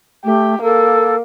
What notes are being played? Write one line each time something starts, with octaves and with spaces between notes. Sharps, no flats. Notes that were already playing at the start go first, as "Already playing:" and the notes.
A3 G4
A#3 A4